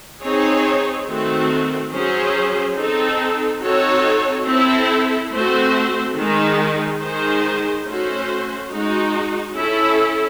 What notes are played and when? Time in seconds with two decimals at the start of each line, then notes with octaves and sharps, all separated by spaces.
0.23 C4 D#4 G#4 C#5
1.08 D#3 A3 C4 F#4
1.93 F#3 C#4 G#4 C5
2.77 C4 D#4 A4
3.63 C4 D#4 F#4 A4 C#5
4.47 C4 E4 A4
5.32 A3 C4 F#4 C5
6.16 D#3 G#3 D#4
7.01 D#3 G#3 D#4 G#4 C5
7.86 A3 C#4 F#4 C5
8.71 G#3 D#4 F#4
9.55 C#4 E4 A4